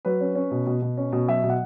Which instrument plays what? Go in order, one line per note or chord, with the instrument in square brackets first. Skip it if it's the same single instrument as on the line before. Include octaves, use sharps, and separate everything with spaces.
[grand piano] F#3 B4
C#4
C#4
B2
B2
B2
C#4
B2
F#3 E5
B2
F#5